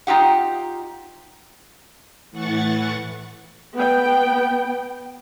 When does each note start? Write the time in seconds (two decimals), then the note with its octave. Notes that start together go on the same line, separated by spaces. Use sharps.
0.07 D#4 F4 G4 F#5
2.31 A2 E3 F#5 C#6 A6
3.76 B3 G5